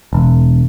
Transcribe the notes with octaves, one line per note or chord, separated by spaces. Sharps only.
E1